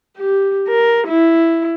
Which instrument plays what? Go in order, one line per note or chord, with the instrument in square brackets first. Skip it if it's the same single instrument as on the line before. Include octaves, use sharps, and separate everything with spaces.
[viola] G4
A#4
E4